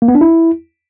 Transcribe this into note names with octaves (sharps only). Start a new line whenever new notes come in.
A#3
B3
D4
E4